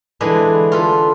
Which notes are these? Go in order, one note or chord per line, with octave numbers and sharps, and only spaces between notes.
D3 E3 G#3 D4 G#4 B4
F4 A4 B4